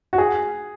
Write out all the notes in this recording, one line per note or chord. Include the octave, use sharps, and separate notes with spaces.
F#4
G#4